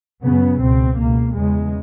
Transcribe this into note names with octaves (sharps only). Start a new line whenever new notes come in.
F#2 C#3 B3
C#2 B2 C4
C#2 B2 A#3
E2 C#3 G#3